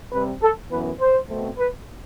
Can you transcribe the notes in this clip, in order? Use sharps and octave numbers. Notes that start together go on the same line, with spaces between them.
C3 G3 C4 B4
A4
F#2 E3 B3 B4
C5
B2 A3 C4
B4